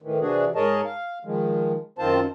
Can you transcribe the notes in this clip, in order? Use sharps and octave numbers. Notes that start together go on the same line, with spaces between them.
A2 D#3 E3
C3 E3 D4 F#4 G#4
G#2 G#4 A#4 C#5 D#5 A5
F5
D#3 F3 G#3
F#2 D#3 C4 F4 C5 A5